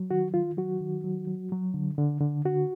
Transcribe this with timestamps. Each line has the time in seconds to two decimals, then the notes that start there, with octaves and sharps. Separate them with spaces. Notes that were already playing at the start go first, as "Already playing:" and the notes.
Already playing: F#3
0.11 D#3 F#4
0.34 D#3 F4
0.57 F#3 F#4
0.81 D#3
1.04 F#3
1.27 F#3
1.52 F#3
1.74 D3
1.98 D3
2.21 D3
2.45 D3 F#4